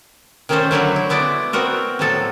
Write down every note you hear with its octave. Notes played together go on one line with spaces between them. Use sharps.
D#3 A3 C#4 D#4 A4 C5
D3 F#3 E4 F#4
E4
G#3 B3 E4 D5
B3 C4 F#4 A#4
A2 C3 F3 F#3 A4